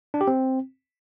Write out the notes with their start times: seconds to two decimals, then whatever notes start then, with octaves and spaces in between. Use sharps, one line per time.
0.14 D4
0.21 G4
0.28 C4